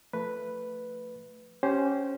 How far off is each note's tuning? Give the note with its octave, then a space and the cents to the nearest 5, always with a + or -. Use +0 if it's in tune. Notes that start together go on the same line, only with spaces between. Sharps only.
F3 +0 A3 +15 B4 +0
C#4 +0 G4 -25 C5 +0